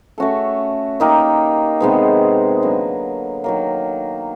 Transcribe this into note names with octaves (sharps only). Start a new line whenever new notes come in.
A3 C#4 F#4 A4
A#3 D#4 G4 A#4
C3 D#3 G#3 B3
D3 F#3 A#3
D#3 F#3 A#3